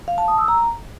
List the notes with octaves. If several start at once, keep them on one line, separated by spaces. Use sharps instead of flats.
F5
A5
D#6
E6
A#5